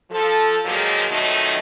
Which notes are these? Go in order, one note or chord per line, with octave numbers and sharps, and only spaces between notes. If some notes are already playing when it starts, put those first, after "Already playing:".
F3 A4
A#2 D#3 F3 F#3 G#3 A#3
F2 B2 D#3 F#3 A3 D#4